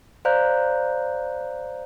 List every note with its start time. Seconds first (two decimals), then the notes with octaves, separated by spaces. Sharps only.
0.25 C5 D5 F5 A#5 F#6 G6